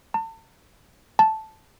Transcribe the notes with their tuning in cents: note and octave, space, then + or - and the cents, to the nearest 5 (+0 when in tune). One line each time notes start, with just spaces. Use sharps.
A5 +35
A5 -5